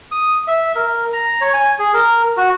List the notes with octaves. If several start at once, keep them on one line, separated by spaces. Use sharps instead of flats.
D#6
E5
A#4
A#5
C#5
G#5
G#4
A#4
F#4